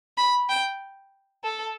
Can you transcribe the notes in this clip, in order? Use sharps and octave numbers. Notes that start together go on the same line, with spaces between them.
B5
G5
A4